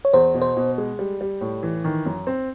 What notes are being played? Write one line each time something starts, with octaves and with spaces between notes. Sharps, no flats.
C#5
E2 C5
B2
C5
B2
G#3
G3
G3
A2
E3
D#3
F#2
C4